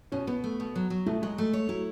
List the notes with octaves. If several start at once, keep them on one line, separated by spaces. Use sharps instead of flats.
B2 C#4
B2 B3
A3
B2
F#3
F#3
B2 A3
F#3 G#3
A3
C#5
F#3 E4